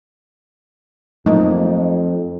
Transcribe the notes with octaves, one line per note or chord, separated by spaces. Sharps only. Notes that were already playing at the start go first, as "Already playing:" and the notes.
F2 F#3 A3 A#3 D#4